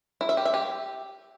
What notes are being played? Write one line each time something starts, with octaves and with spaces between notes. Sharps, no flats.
E4
E5
G4
E5
G4